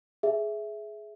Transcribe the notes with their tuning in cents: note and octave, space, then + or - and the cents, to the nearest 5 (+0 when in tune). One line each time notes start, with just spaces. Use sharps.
G#4 +20 E5 +0